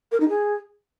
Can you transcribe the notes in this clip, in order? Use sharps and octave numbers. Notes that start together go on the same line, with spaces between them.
A#4
D#4
G#4